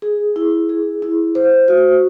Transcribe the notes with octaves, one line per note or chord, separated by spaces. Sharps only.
G#4
E4
G#4
E4
C5
F#4